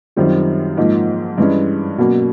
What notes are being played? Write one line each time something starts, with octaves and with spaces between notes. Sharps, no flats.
F#2 D#3 G3 C4 F4
G#2 F3 A#3 D#4
G2 E3 G#3 C#4
B2 F#3 A#3 C#4